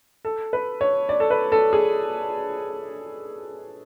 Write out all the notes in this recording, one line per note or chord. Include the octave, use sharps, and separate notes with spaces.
A4
B4
C#5
D5
A4
B4
A4
G#4